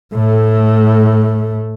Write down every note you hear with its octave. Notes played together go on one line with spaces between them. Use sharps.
A2 A3